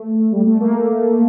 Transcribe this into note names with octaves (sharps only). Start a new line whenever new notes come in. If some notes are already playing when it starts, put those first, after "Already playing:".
Already playing: A3
G3
A3
A#3